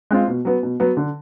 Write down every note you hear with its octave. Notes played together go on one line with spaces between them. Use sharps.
G#3 C4 F4
B2
F#3 B3
B2
F#3 B3
D3